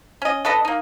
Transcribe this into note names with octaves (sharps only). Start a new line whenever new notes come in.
C#4 D#5
D4 A4 B4 D#5
A#3 D#4